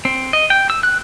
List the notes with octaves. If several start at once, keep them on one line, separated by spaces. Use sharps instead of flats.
C4
D#5
G5
E6
F#6